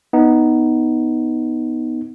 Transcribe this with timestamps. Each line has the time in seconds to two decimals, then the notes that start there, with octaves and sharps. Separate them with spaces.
0.13 B3 D#4